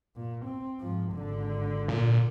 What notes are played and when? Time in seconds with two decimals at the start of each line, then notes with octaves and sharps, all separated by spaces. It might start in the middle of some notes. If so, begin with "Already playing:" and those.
0.16 A#2
0.45 C4
0.79 G#2 F3
1.13 G#1 D3
1.88 A#2